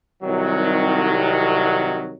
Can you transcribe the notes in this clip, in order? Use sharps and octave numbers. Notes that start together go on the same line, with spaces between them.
C2 D#3 F#3